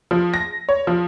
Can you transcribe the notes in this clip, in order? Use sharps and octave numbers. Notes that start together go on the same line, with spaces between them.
F3
A#6
C#5
F3